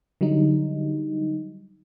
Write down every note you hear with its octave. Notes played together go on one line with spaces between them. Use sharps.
D3 F#3 G3 D#4